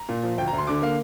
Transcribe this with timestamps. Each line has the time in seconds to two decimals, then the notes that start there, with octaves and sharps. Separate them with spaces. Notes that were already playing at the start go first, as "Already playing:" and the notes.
Already playing: A#5
0.09 A#2
0.23 F3
0.38 D2 G5
0.48 A#5
0.53 D2
0.58 C6
0.67 D3 D6
0.82 A#3 F5